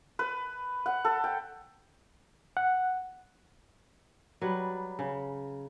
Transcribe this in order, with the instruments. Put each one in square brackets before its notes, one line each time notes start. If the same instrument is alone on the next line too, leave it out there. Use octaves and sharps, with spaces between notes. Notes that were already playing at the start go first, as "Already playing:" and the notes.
[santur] B4
F#5
A4
G5
[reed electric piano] F#5
[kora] F#3 G3 B4
C#3